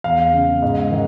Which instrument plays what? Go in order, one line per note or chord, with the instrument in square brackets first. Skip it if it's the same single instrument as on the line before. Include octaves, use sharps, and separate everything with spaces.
[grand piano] E2 F5
C#3
G#2
D#3